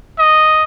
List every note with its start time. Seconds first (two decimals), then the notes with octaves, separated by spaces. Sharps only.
0.19 D#5